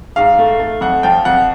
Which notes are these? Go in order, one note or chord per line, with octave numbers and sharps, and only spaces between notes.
G#2 F5
A3
A3
F2 F#5
F3 G5
F2 F#5